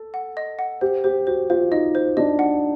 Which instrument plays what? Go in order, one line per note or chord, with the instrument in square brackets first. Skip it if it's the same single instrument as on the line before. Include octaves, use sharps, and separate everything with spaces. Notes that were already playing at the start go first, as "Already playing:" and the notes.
Already playing: [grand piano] A4
[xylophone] F#5
D#5
F#5
[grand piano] G4 [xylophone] C5
[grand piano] G4 [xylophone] C5
[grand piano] F#4 [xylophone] C5
[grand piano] F4 [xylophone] C5
[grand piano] D#4 [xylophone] D#5
[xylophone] C5
[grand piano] D4 [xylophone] D#5
[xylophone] F#5